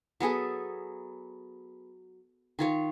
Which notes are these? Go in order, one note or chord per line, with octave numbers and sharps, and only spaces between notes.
F#3 B3 G#4 A4
D#3 F4 C#5